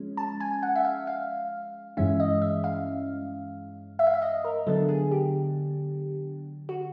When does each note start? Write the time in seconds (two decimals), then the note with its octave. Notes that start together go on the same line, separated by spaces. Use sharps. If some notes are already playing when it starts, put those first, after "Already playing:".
Already playing: F3 G#3 C#4
0.17 A5
0.40 G#5
0.63 F#5
0.75 E5
0.85 F5
1.07 F5
1.97 G2 E3 G#3 C#4 E5
2.20 D#5
2.42 E5
2.64 F5
3.99 E5
4.07 F5
4.14 E5
4.22 D#5
4.44 A#4
4.67 D3 F#3 B3 D4 A4
4.89 G#4
5.11 G4
6.69 F#4